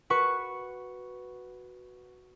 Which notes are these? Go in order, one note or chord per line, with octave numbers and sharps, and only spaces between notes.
F#4 B4 C#6